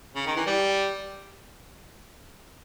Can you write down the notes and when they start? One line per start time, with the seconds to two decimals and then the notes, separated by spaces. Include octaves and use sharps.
0.15 C#3
0.27 D#3
0.36 E3
0.47 G3